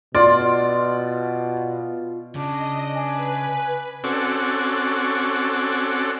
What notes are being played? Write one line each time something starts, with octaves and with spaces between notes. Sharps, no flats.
B2 F4 D5
C#3 D4 D#5
B4 G#5
C4 C#4 F#4 A4 D5